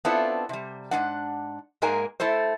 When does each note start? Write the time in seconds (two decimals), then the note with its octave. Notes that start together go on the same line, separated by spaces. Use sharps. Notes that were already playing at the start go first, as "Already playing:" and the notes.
0.05 B3 C4 D4 E4 F4 A4
0.49 C3 G3
0.91 G#2 F3 D4 F#5
1.82 G#2 G#3 A#3 A#4 G#5
2.20 A3 E4 A4 C5